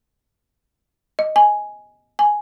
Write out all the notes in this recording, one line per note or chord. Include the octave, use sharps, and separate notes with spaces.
D#5
G#5
G#5